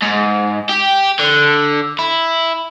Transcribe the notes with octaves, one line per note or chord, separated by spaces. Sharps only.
G#2
G4
D3
E4